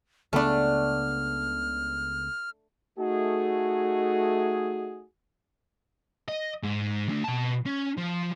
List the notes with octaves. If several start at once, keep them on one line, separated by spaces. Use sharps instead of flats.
C#2 C#3 A3 B3 D4 F6
A3 D#4 F#4 G#4
D#5
G#2
A3 D4
B2 A5
C#4
F3